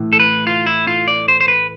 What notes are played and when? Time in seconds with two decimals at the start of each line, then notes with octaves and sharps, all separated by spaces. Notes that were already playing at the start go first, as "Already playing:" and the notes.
Already playing: A2 E3
0.13 A4
0.20 B4
0.47 F4
0.66 E4
0.87 F4
1.08 D5
1.28 C5
1.41 C5
1.48 B4